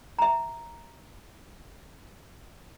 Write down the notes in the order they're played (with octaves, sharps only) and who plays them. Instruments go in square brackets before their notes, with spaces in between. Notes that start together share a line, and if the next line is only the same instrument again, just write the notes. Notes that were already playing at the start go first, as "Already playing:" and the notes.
[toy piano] E5 A#5